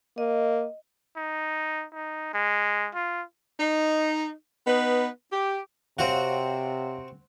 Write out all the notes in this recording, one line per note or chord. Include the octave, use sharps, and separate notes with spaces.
A#3 D#5
D#4
D#4
G#3
F4
D#4
B3 D#4 B4
G4
C3 C4 F#4 C#5 F5 F#5